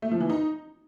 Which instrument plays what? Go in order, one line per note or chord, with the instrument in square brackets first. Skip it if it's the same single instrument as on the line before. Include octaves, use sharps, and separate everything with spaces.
[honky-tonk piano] A3
F3
E3
D#4